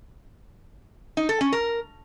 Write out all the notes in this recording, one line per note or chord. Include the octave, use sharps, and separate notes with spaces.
D#4
A4
C#4
A#4